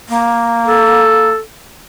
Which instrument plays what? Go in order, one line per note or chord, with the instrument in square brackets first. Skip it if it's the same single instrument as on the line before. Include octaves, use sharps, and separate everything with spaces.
[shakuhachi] A#3
[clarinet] A4